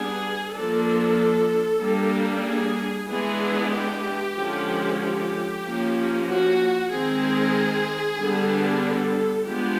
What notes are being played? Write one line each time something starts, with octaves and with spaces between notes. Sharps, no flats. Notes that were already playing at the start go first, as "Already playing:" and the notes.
Already playing: G3 B3 D4 G#4
F3 A#3 D4 A4
G3 A#3 D4
G#4
E3 G#3 B3 D4 G#4
G4
D3 F3 G#3 C#4
G4
F3 A#3 C#4
F#4
D#3 G#3 C4 G#4
D3 G3 B3 D4
A4
F3 G#3 B3 D4 G4